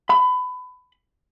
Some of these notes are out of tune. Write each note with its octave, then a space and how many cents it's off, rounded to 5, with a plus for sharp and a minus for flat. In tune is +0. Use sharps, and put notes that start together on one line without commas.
B5 +25